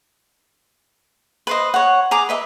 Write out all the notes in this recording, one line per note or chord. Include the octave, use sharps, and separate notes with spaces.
B4 C5 D#5
C#5 F#5
G#4 A#5 D6
B4 D#5 E5